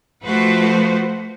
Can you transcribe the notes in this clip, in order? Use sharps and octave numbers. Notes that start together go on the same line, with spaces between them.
F3 A3 F#4 B4 C5